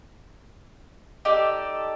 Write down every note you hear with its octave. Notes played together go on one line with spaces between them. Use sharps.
D#4 G4 A4 D5